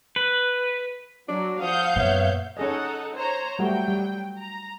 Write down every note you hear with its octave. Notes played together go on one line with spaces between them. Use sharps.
B4
F#3 D4
F3 F5 F#5 D#6 G6
F#2 A#2 B3 C#5 E5
C#4 D#4 G#4 A4 D#5 F#5
C5 C#5 A#5
F#3 G3 A3 F#4 G5
G3
A#5